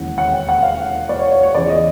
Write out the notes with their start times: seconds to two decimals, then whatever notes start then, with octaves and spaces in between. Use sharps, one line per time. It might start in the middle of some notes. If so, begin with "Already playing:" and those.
Already playing: E1 D#2 C#3 E3 F#5
0.18 F#5
0.32 G5
0.49 F#5
0.63 F5
1.09 D5
1.20 C#5
1.31 C#5
1.43 C#5
1.55 E2 C#3 F3 D5
1.69 D#5